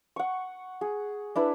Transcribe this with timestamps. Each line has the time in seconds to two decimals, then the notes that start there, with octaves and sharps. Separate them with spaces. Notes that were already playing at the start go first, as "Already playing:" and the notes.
0.16 F#5 C#6
0.81 G#4
1.36 D4 E4 B4